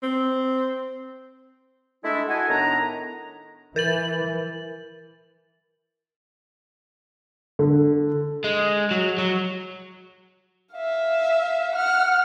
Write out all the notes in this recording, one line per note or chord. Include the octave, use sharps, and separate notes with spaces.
C4
G#3 A3 D4 E4
F#4 A4 D#5 F#5 G#5
A2 D#3 B3 D4 A#5
E3 A#4 A6 F#7
D3
G#3
F#3
F#3
E5 F5
F#5 F6